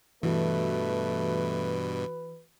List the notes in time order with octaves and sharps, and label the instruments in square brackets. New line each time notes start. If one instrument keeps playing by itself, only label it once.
[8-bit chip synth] G2 B2 [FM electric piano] E3 F#4 [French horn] A3 [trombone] B4